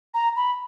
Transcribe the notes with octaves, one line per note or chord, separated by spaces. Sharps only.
A#5
B5